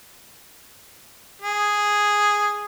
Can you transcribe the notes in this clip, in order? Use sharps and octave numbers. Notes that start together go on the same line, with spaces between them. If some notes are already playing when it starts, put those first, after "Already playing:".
G#4